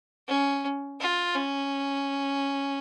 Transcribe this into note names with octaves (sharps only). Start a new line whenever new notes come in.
C#4
F4
C#4